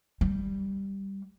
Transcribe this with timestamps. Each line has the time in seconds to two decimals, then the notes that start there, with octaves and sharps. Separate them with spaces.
0.21 G3